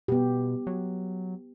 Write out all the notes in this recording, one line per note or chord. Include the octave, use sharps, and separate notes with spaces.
B2 B3 G4
F#3